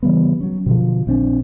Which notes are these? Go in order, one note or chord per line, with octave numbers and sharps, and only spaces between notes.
C#3 E3 G3 B3
F#3 C#4
B2 D3 F3
A#1 C4 D4